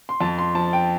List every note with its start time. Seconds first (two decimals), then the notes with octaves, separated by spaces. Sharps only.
0.09 C6
0.21 F2 A5
0.38 C6
0.55 F3 A5
0.73 G5